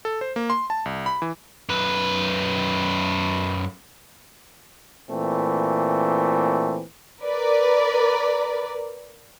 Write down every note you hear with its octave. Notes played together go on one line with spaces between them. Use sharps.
A4
C5
A#3
C6
A5
C2
B5
E3
F#2 B4
A#2 E3 A3 C4
A#4 B4 D5